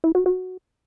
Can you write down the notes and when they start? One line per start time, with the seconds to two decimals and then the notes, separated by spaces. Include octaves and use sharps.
0.04 E4
0.15 F#4
0.26 F#4